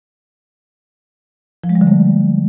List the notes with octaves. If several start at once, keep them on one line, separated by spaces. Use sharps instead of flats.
F3
G#3
G3
D3
A3